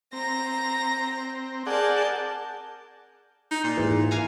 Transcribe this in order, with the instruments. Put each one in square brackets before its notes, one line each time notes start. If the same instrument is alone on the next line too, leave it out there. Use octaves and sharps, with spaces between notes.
[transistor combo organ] C4 [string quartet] A#5 A#6
[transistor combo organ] G#4 D5 F#5 [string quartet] A#4 A5 G6
[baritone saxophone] D#4
A#2
[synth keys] G#2 E3
[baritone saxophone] E3 [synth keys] F5 G#5 A#5